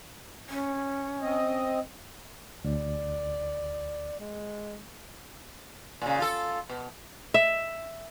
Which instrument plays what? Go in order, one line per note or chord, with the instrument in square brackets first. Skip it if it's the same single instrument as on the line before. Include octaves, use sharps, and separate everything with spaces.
[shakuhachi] C#4
[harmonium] C4 D#5
[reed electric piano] D2 [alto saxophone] D5
[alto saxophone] G#3
[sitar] A#2 C#3
F4 A4
B2
[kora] E5